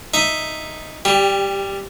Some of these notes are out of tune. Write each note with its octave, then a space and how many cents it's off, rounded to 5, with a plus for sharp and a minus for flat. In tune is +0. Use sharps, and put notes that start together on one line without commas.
D#4 +0 E5 +0
G3 +0 G4 +25